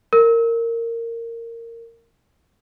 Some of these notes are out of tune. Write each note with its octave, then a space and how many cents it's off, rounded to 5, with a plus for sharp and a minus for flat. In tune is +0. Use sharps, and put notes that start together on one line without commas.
A#4 -15